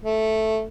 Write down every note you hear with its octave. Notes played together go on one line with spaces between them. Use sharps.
A3